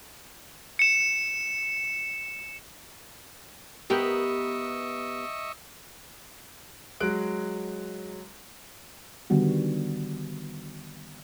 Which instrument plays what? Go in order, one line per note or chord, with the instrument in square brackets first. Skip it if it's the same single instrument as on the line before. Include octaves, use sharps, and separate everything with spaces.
[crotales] C#7 E7
[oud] B3 G4 A#4 [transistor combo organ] D#5 E5 C#6
[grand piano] F#3 G#3 F#6 D7
[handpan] D3 D#3 G3 B3 F#4